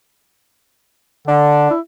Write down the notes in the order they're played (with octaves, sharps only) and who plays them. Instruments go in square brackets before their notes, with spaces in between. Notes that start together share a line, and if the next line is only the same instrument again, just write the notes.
[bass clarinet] D3 [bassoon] D4
[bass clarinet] E4